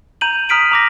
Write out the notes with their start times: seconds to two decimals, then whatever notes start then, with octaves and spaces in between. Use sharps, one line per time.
0.21 A#5 G6 D#7 F#7
0.49 A#5 D#6 F6 B6 D7 F#7
0.71 A#5 D6 A#6